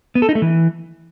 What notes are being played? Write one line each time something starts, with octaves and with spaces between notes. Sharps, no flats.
B3
A4
D#4
A3
E3